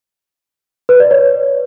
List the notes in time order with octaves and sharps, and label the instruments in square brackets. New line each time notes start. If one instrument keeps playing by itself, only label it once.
[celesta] B4
D5
C#5